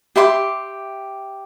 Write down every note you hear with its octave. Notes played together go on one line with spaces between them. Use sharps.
G4 E5 C6 D6